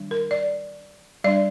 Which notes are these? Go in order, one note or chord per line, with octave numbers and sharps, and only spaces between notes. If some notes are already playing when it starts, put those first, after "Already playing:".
Already playing: D#3 G3 D4
A#4
D5
G3 D4 D5